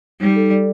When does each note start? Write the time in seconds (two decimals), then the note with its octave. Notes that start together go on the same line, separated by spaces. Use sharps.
0.20 G3 D#4
0.36 A4
0.51 D5